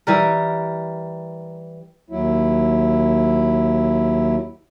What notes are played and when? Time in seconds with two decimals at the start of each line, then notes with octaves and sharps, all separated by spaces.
0.07 E3 G3 A#4
2.10 D#2 F#3 E4